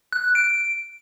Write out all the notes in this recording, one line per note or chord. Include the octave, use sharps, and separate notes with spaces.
F#6
F#6
D7
D7